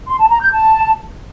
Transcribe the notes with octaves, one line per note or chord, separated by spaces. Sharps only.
C6
A5
A#5
G6
A5